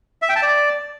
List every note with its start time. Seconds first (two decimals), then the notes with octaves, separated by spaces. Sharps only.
0.22 E5
0.29 G5
0.36 A5
0.43 D5